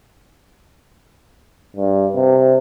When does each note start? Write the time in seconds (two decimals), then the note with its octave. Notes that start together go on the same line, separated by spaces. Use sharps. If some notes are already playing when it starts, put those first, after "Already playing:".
1.77 G2
2.15 C3